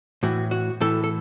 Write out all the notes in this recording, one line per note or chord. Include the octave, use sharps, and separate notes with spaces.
A2 E3 F#4
F#4
A2 E3 A4
A4